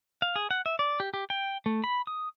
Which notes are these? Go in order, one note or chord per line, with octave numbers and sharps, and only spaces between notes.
F5
G#4
F#5
E5
D5
G4
G4
G5
A3
B5
D#6